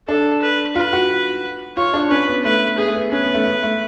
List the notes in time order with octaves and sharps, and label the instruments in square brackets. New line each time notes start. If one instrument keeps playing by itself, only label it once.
[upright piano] D4 [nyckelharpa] A4
[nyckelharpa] B4
[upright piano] F4 [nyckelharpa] B4
[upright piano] F#4
[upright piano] F4 [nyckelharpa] C#5
[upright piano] D4
[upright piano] C#4 [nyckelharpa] B4
[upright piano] B3
[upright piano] A3 [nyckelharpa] B4
[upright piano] B3 [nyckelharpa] G#4
[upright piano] A3
B3
[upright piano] C#4 [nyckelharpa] B4
[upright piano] B3
A3
B3
A3